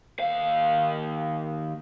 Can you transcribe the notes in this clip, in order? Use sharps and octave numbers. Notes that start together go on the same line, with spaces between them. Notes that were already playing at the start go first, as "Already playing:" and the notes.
D#2 F5